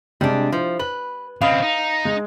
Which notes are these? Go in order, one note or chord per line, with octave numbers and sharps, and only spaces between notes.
C3 G3 G#3 D4
F3 E4 C5
B4 F#7
C#3 C4 D#5 F5 B5 D#6
D#4
G#3